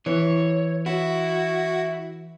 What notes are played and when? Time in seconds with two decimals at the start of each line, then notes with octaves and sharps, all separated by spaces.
0.06 E3 C#5
0.86 E4 F#4